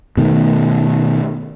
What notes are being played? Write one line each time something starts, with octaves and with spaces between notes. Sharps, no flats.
B2 D#3 A3